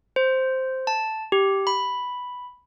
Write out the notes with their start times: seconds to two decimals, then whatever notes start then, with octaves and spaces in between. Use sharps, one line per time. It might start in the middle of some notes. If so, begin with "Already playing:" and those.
0.16 C5
0.87 A5
1.32 G4
1.67 B5